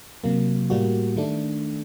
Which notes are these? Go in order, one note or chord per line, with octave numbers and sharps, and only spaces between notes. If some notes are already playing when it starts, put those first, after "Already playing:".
C3 F#3 A#3
A2 G3 A#3 F#4
D#3 A3 D4